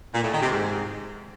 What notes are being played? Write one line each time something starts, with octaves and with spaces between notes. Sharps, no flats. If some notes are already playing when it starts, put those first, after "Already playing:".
A#2
A2
D#3
C3
G#2